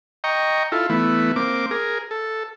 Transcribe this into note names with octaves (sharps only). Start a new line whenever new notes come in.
D#5 G5 A#5 C#6
E4 F4 A4
E3 A3 B3 E4
A#3 C4 D6
G#4 A#4
A4